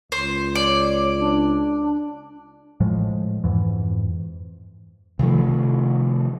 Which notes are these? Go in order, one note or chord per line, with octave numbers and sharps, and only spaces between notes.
C#2 C5
C#5 D5
D4
A2 F3 G#3
F2 G#2 E3
C3 D#3 F3 A3